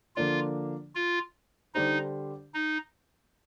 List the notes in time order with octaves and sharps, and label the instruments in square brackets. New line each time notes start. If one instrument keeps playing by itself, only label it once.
[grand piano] D3 F3 A#3 D4 [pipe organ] F4
[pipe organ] F4
[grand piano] D3 G3 D4 G4 C5 [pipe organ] D#4
[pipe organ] D#4